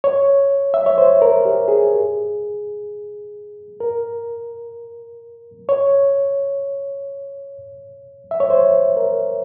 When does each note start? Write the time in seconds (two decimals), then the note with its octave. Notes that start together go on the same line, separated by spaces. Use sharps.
0.04 C#5
0.74 E5
0.86 C#5
0.98 C5
1.22 A#4
1.45 G4
1.68 G#4
3.80 A#4
5.69 C#5
8.31 E5
8.40 C#5
8.50 C5
8.97 A#4